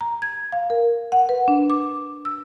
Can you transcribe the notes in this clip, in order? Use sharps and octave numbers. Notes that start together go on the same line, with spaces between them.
A#5
G#6
F5
A#4
F#5
B4
D4
D6
E6